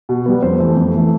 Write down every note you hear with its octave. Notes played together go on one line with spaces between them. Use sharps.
B2
G3 B3
F2 C5
E3 A3
F2
E3 A3